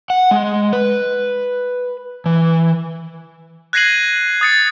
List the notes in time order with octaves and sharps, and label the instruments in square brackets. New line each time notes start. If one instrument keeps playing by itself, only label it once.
[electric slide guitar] F#5
G#3
B4
E3
[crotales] F#6 G#6 A#6 C7 D#7 F#7
D#6 A6 C#7